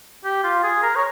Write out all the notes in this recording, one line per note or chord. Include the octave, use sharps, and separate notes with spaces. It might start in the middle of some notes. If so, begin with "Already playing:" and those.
G4
F4
G#4
A#4
C#5